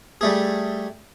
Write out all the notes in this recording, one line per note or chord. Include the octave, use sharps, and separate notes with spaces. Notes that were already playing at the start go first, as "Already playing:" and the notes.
G3 A3 G#4